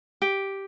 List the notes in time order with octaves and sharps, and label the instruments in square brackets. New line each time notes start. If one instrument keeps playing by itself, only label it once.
[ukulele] G4